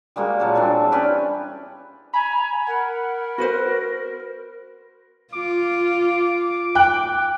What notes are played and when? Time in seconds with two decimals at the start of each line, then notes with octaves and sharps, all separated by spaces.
0.16 G3 G#3 A#3 F#4
0.40 A#2 F#3 F#5 A5
0.55 E3 G3 C4 D4
0.92 C#4 G4 B4
2.14 G#5 A#5 B5
2.67 A#4 F#5
3.38 F#4 B4 C5 A#6
5.33 F4 D6
6.75 G5 F#6